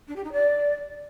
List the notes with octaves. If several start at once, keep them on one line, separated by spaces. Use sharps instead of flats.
D4
G4
D#4
D5